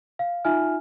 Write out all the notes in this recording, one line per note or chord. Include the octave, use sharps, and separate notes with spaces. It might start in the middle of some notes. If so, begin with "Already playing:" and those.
F5
D#4 F4 E5 G#5 F6